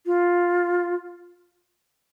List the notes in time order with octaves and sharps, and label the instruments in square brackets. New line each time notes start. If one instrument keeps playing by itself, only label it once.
[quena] F4